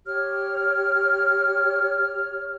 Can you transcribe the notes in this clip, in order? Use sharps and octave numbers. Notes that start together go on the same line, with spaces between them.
G4 C#5 F6